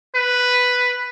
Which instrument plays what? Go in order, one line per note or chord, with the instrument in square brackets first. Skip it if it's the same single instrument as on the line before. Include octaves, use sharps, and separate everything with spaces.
[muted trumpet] B4